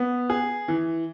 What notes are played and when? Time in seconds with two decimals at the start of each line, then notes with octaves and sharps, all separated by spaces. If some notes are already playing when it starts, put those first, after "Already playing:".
Already playing: B3
0.30 G#4
0.68 E3